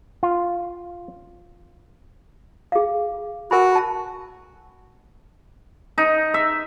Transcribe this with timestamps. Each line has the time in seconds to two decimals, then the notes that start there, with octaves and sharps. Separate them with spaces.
0.23 F4
2.72 G#4 F5
3.51 F#4 A#4 G#5 B5
3.75 A5
5.98 D#4
6.34 E5